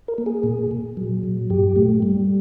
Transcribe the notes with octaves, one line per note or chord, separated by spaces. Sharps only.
A#4
A#3
G#4
A#2
A#2
F#3
A#2
G2 G4
A3
G3